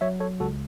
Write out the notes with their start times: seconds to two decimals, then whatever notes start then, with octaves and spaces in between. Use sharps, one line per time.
0.01 F#3 C#5 E5
0.20 A4 C#5
0.40 C#2 F#4 A4